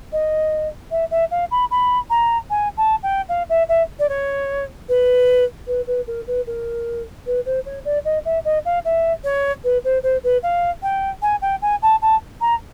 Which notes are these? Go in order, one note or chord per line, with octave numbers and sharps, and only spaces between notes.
D#5
E5
E5
F5
B5
B5
A#5
G#5
A5
G5
F5
E5
E5
D5
C#5
B4
B4
B4
A#4
B4
A#4
B4
C5
C#5
D5
D#5
E5
D#5
F5
E5
C#5
B4
C5
C5
B4
F5
G5
G#5
G5
G#5
A5
A5
A#5